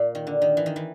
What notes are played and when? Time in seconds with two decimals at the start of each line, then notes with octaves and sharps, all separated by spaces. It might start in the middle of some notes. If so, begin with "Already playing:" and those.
Already playing: A#2
0.15 D#3
0.27 D3
0.42 D#3
0.57 E3
0.66 D#3
0.76 E3